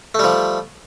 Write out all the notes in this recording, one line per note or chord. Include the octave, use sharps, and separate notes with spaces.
F3 G3 A3